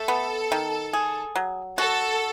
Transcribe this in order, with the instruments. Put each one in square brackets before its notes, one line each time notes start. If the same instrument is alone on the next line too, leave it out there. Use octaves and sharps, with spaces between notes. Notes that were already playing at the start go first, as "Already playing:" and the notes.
Already playing: [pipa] A3 [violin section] A4
[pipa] B3
D#3
G#4
F#3
[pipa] F#4 [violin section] A4